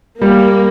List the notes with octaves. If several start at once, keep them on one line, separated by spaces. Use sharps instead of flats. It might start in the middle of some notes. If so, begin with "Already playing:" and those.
G3 A#3